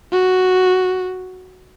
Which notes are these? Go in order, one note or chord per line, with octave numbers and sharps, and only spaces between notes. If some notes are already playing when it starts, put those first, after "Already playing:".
F#4